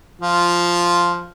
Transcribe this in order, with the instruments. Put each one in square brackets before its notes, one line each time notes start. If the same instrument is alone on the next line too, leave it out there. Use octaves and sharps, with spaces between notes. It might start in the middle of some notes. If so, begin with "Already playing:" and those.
[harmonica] F3 F4